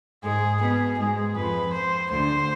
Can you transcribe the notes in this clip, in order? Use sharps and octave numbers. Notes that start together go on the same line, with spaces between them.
G#2 G#3 G#4
B2 B3 G#4
G#2 G#3 G#4
F2 F3 B4
C5
D2 D3 C5